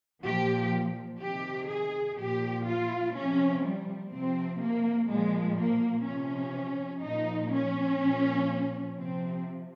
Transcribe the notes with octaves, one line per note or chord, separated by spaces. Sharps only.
A#2 F3 G4
C3 D#3 G4
G#4
A#2 F3 G4
F4
C3 F3 C#4
G3
C3 F3 C4
A#3
A#2 F3 G#3
A#3
C3 F3 C#4
A#2 F3 D#4
C#4
A#2 F3
C3 F3 C4